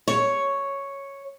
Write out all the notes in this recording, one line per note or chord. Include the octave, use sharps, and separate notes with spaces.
C#5